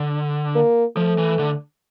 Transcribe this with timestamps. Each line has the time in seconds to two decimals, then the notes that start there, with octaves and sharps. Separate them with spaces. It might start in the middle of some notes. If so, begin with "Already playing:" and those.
Already playing: D3
0.55 A#3
0.96 F3 A3
1.18 E3
1.39 D3